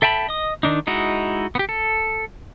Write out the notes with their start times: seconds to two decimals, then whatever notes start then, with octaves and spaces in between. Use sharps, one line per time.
0.02 A4 E5 G5 A5 B5
0.29 D#5 D#6
0.63 D#3 D4 D#4
0.87 G#3 D#4 E4 F#4
1.55 B3 G4
1.69 A4